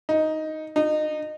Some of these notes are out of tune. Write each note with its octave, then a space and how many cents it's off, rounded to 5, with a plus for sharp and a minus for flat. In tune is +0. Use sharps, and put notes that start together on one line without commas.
D#4 +5
D#4 -25